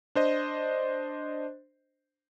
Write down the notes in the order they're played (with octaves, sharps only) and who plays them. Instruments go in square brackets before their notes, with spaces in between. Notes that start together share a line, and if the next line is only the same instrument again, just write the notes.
[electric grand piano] D4 C5 D#5